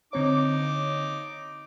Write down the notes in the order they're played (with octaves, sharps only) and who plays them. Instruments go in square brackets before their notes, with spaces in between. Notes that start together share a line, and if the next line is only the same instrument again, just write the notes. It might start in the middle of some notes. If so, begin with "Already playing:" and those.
[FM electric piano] D3 C4 C#5 [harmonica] D#4 D6